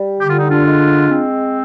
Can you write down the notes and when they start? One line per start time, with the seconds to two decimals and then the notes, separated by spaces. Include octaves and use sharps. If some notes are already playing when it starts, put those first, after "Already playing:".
Already playing: G3
0.21 D3 G4
0.30 F4
0.40 D#4
0.49 D4 F4
0.66 G#3
1.10 C4